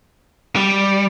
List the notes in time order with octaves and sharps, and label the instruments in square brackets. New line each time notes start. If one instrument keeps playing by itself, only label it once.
[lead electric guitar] G3